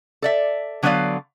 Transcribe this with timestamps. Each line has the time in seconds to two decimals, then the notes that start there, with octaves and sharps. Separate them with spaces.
0.22 A4 D5 E5
0.83 D3 F#3 B3 C5 D5 F5